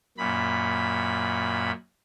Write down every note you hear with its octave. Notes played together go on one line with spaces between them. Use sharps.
F#2 A#2 B5